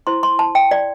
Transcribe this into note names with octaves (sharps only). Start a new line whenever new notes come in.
E4 C5 C6
C6
A5
G5
D5